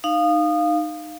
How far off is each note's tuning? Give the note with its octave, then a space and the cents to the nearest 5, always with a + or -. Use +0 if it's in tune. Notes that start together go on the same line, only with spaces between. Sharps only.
D#4 -20 F5 +0